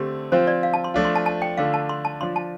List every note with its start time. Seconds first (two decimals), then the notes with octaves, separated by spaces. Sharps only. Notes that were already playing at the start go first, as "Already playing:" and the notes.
Already playing: D3 A3 C4 G4
0.32 F3 C4 F4 C5
0.47 D5
0.63 F5
0.74 A5
0.84 C6
0.94 F3 A3 D4 F4
1.05 C6
1.15 A5
1.26 A5
1.42 G5
1.58 D3 A3 D4 F4 F5
1.74 A5
1.89 C6
2.05 A5
2.21 F3 D4 F4 C6
2.36 A5